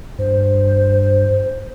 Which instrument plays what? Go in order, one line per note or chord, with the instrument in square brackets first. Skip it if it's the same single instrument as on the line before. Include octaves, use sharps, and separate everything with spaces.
[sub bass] G2 [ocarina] C5